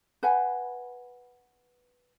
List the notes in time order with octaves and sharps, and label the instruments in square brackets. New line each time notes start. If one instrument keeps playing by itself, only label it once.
[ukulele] B4 F#5 G#5